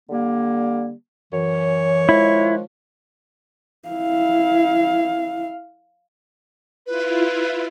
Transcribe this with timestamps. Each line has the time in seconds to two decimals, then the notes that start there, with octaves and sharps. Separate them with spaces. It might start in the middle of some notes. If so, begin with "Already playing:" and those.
0.10 D3 G3 A#3
1.33 F#2 E3 C#5
2.09 D#3 F3 G#3 E4
3.89 E4 F5
6.86 E4 F4 B4